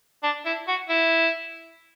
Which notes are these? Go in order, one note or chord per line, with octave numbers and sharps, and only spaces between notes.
D4
E4
F#4
E4